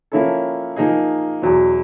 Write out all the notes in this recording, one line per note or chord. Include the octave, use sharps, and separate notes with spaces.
F3 A#3 C#4 E4 A4
F3 A#3 D#4 G#4
E2 B2 F#3